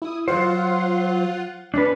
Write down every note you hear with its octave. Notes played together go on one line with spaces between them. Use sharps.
E4 D#6
F#3 F4 C5 F#5
C#4 D4 B4